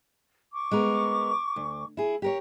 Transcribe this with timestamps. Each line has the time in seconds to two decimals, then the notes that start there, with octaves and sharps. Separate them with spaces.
0.53 C#6 D6
0.71 G#3 B3 A#4
1.56 D2
1.97 E4 G#4
2.22 G4 A#4 C#5